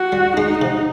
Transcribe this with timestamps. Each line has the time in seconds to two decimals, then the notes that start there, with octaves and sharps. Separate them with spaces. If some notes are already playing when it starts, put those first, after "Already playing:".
Already playing: F#4
0.12 G3
0.37 G#3 D#4
0.62 C3